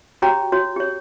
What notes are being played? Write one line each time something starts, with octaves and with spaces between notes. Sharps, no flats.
F#4 G4 C#5 G5 A#5
F#4 C#5
G4 C#5